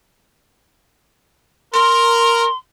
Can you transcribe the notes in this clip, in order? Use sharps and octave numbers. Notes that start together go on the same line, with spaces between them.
A#4 C6